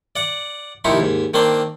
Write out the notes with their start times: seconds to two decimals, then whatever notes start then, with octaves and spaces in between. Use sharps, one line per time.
0.16 D5 F#5
0.84 D#2 C3 F3 D#4 E4 C#6
1.00 D#2 G#2
1.34 D#3 A#3 C4 D4 C6